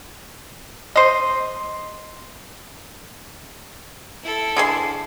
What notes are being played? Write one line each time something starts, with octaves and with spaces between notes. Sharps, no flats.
C5 D#5
E4 A4
D3 G#4 C6